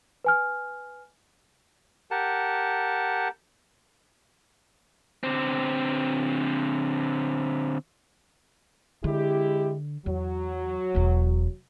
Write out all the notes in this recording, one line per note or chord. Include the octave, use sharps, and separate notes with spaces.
B4 G#5 F6
G4 A#4 F#5 A5
D3 C4
D3 G#3 E4 G4
E2 F#3
E1 E2